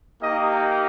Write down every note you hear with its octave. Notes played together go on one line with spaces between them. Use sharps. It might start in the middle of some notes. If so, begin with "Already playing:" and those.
A#3 D#4 G4 D#5